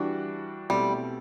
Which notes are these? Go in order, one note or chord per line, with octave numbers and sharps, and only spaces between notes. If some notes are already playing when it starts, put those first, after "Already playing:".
Already playing: E3 G3 D4 F#4
B2 G3 A3 C4 E4 G4